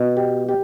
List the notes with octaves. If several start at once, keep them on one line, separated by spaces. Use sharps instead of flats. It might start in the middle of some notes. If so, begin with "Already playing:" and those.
Already playing: B2
G4
G4